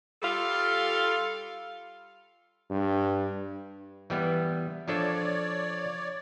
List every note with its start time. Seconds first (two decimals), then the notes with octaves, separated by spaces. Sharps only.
0.23 G3 F4 A4 F5
2.70 G2
4.10 E3 G3 B3
4.88 F3 D4 A4 C#5 D5